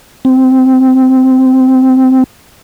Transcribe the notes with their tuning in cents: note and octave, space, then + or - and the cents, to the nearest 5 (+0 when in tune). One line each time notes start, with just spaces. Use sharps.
C4 -10